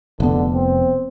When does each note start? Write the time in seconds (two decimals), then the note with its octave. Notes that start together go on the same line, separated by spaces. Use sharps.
0.20 F1 D3 B3
0.54 C4